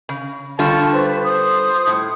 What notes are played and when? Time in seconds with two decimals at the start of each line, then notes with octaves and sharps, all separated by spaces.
0.09 C#3
0.59 D3 G3 F4 A5 C#6
0.92 B4 C5
1.24 C5 D#6
1.87 A2